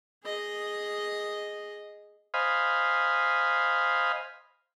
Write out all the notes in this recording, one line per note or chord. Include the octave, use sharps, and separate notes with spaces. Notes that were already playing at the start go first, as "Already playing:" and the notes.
G#4 D#5
C5 D#5 F5 G#5 B5